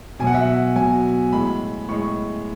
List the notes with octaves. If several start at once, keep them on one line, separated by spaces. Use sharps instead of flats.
B2 F#3 F#5 G#5
E5
F#5
B2 F#3 G#5
A2 G#3 B5
A2 G#3 C#6